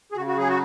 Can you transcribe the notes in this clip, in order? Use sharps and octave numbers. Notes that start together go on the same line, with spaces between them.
G#4
C#3 F#4
F#4
F#3 G#4
F#4